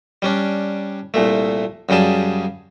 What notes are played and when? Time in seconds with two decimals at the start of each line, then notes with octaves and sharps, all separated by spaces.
0.22 G3 C#4 D4
1.14 C2 A#2 A3
1.89 F#2 C#3 G3 G#4 A5